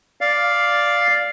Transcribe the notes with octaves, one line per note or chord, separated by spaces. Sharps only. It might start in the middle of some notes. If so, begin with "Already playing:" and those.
D5 F5